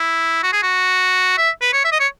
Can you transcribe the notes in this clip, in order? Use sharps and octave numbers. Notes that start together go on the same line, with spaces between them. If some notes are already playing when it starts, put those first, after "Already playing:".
Already playing: E4
F#4
G#4
F#4
E5
B4
C#5
E5
D#5
C#5